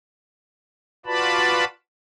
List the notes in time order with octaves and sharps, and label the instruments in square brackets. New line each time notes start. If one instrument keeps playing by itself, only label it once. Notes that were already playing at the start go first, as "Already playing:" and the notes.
[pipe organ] F4 F#4 B4 D5 A5 B5